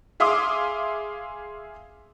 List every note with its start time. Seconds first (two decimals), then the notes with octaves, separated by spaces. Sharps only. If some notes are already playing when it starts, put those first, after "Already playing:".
0.20 G#4 E5 F5 C6 D6 D#6